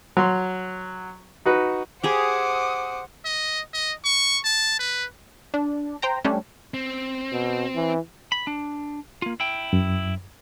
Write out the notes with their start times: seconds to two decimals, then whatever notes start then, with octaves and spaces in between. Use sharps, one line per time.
0.17 F#3 C6
1.46 D#4 F#4 B4
2.03 G4 G#4 C5 F#5 D6 D#6
3.25 D#5
3.74 D#5
4.05 C#6
4.44 A5
4.79 B4
5.54 D4
6.02 C5 G5 A#5
6.24 G3 A3 C#4 D4
6.74 C4
7.32 B2
7.75 E3
8.32 B5
8.47 D4
9.22 A#3 F4
9.40 E4 G5
9.73 F#2